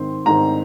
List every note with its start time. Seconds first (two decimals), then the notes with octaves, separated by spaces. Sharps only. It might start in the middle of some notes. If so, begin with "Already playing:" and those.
Already playing: G#2 D#3 C4 C6
0.26 G#2 D#3 C4 A#5